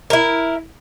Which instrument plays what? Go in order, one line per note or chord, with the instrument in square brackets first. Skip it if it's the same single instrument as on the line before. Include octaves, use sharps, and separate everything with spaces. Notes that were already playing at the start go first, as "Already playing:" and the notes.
[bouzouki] E4 A#4